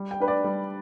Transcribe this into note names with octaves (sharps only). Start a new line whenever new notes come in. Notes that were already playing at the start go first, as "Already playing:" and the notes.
Already playing: G3
G5
D4 B4
D5
G3